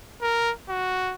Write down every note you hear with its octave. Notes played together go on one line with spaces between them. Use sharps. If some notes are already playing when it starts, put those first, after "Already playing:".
A#4
F#4